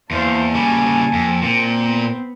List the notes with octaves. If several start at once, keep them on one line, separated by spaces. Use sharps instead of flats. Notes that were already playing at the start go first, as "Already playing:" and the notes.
E2 A#3 C5 F5 A5
C#3 G3 G#5
F2
A#2 C4
B3